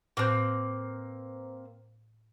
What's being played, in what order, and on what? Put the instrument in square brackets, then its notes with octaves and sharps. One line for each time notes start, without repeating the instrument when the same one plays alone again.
[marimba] A2 F#6 G6 [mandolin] A#3 C4 [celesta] B4 C5